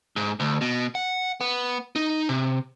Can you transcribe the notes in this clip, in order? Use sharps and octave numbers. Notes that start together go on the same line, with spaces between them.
G#2
D2
B2
F#5
B3
D#4
C3